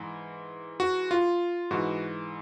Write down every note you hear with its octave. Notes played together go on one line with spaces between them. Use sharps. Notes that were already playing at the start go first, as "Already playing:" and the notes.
Already playing: G#2 E3
F#4
F4
G#2 E3 F#4